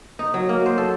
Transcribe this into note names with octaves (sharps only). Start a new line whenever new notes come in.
D#4
F#3
A#3
C5
A4